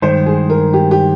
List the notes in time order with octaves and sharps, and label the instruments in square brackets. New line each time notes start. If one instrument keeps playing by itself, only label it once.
[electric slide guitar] G2 D#3 G#3 [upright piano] C5
[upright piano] G#4
A#4
G4
G4